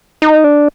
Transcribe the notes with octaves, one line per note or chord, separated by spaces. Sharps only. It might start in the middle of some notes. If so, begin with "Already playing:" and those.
D#4
D4